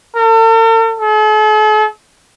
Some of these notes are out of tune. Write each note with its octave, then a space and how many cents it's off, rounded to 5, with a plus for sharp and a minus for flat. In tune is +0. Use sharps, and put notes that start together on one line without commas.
A4 +45
A4 -45